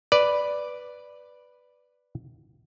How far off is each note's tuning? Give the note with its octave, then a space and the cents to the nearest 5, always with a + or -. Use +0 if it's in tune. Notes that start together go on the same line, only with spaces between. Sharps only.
B4 +0 D5 +0